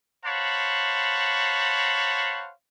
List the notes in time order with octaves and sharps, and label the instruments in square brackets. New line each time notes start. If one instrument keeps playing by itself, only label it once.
[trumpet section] C5 C#5 F5 F#5 A5 B5